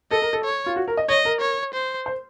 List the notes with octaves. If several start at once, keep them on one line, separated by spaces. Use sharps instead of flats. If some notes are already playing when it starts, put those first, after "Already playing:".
A4 D#5
A#4
A4
C#5
F4
F#4
A#4
D#5
C#5 D#5
A#4
C#5
C5
C5